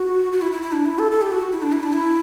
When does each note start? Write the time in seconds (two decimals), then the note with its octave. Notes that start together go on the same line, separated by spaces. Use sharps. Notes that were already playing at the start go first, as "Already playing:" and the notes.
Already playing: F#4
0.32 F#4
0.42 E4
0.52 E4
0.62 E4
0.72 D4
0.86 E4
0.99 A4
1.11 A4
1.22 G4
1.32 F#4
1.52 E4
1.62 D4
1.72 E4
1.83 D4
1.93 E4